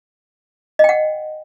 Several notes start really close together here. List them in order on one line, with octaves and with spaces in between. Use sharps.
D#5 G5 F#5